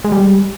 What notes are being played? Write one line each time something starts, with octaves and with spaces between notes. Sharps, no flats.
G#3
G3